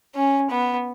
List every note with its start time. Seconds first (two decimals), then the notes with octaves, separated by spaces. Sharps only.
0.15 C#4
0.50 B3